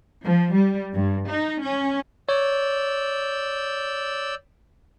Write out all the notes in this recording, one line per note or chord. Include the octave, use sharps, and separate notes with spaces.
F3
G3
G2
D#4
C#4
C#5 D5 E6 G6